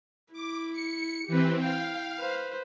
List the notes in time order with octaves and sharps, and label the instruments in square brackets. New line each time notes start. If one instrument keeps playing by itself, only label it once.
[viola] E4 [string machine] D6
[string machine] C#7
[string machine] E3 C4 [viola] G4 B4
[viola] E4 G5 [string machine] F5
[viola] B4 C5